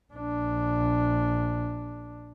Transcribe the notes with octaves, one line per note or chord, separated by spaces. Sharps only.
A#1 D4